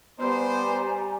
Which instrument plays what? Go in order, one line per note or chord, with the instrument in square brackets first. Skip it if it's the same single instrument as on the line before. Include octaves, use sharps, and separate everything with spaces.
[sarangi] G3 [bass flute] B3 [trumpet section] C5 [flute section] D5 G#5 A#5